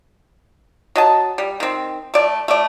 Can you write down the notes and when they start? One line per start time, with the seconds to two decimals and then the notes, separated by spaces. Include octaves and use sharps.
0.96 F#3 D#5 A5
1.38 G3
1.60 D#3 C4
2.14 A3 D5
2.48 A3 D5